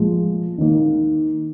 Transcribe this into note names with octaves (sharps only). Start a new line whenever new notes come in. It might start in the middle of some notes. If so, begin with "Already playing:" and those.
Already playing: A#2 F3 G#3
D#3 A#3 D#4